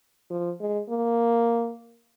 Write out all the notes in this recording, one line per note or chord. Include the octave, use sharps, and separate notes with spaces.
F3
G#3
A#3